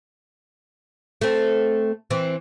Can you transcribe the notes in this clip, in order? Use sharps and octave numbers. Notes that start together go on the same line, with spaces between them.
A3 C4
E3 C4